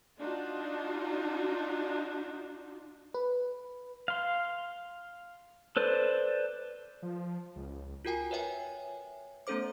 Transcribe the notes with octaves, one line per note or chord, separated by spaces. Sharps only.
D4 D#4 F4 F#4
B4
F5 C6
A4 B4 C5 D5
F3
C#2
F4 F#4 A#4 G5 G#5
B4 C#5 E5 G5 G#5
A3 B3 C#4 A4 C5 D6